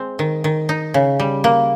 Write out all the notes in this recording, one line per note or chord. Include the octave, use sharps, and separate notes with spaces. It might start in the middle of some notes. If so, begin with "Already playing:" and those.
Already playing: G#3 C4
D#3
D#3
D#4
C#3
G3
A#3